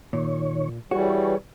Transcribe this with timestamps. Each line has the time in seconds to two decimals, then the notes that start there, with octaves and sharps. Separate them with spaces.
0.13 A#2 D#3 C#5
0.91 E3 G3 F#4 G#4 C#5